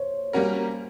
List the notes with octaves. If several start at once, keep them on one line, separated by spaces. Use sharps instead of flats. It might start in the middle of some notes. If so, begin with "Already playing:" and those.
Already playing: C5 C#5
G3 A#3 C#4 F#4 A#4